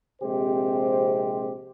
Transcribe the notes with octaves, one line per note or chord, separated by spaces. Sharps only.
A#1 C3 G#3 C4 G4 C5